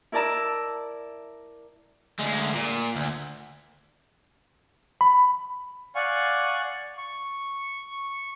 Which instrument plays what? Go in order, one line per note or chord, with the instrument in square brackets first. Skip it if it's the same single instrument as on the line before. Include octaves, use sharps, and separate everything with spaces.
[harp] E4 A#4 D5 A5 A#5 E6
[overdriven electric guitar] D2 G#3
A#2
D2
[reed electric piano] B5
[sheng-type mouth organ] D5 F5 F#5 G#5 C#6
C#6